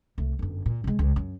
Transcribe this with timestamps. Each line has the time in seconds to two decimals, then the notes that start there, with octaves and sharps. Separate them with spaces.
0.18 C2 A3
0.39 G1 F#2
0.66 A#2
0.84 C3 G#3
0.99 C#2
1.16 F#2